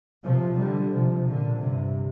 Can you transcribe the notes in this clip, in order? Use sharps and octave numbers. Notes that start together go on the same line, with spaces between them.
C3 F3
D3 G3
C3 F3
A#2 D3
G2 C3